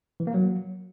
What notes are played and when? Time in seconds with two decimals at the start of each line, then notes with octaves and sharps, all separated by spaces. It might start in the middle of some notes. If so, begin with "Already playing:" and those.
0.20 E3
0.27 A#3
0.34 F#3